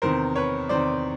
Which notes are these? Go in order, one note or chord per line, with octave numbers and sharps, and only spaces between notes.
E2 C3 D#3 A#4 C5
B4 C#5
E2 C3 D#3 C5 D5